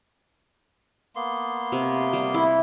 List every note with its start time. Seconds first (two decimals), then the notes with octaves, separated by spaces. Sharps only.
1.16 A#3 B3 C6
1.72 C3
2.13 G3
2.34 E4